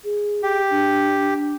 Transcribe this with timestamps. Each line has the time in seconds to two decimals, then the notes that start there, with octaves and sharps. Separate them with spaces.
0.04 G#4
0.43 G4
0.70 D4